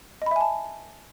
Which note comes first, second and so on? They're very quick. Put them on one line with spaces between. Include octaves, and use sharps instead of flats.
D#5 B5 E5 G#5 A5